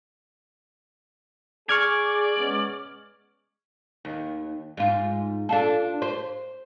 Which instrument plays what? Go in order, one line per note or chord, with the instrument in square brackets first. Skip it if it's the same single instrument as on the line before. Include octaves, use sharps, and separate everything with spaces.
[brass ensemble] G#4 [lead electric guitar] D5 [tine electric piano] C#6 F6 G#6
[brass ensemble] G#3 B3 C#4
[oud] D#2
G#2 F4
D4 F4 A4
C5